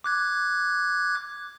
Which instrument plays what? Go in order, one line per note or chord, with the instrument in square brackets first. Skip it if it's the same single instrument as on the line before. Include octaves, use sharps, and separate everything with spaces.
[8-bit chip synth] D6 F#6 G#6